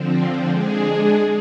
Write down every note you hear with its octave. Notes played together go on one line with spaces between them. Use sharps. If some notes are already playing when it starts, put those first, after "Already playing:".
Already playing: D3 F3 C4
G#3 D4 G#4